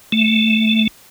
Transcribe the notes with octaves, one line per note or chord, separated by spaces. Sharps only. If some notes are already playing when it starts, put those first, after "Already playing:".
A3